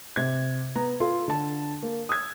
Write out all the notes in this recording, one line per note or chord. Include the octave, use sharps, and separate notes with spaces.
C3 G#6
B3 A#5
F4 A4 C6
D3 A5
A#3
D#6 E6 G#6